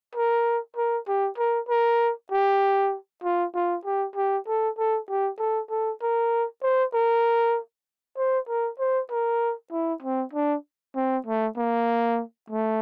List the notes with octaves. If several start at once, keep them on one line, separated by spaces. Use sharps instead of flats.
A#4
A#4
G4
A#4
A#4
G4
F4
F4
G4
G4
A4
A4
G4
A4
A4
A#4
C5
A#4
C5
A#4
C5
A#4
E4
C4
D4
C4
A3
A#3
A3